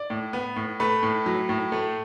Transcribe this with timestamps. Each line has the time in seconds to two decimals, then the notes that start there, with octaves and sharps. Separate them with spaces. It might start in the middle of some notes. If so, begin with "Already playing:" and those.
Already playing: D5
0.10 A2
0.33 B3
0.56 A2
0.80 A3 B4
1.03 A2
1.26 F#3
1.49 A2
1.72 A3